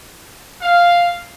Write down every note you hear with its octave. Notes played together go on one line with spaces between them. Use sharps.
F5